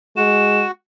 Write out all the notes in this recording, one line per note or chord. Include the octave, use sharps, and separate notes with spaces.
G#3 F#4 E7